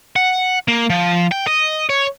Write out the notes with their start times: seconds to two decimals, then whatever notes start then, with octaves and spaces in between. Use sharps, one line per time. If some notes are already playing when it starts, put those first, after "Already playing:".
0.16 F#5
0.68 A#3
0.90 F3
1.32 G5
1.47 D#5
1.90 C#5